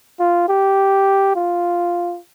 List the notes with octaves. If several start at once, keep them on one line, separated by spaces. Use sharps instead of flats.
F4
G4
F4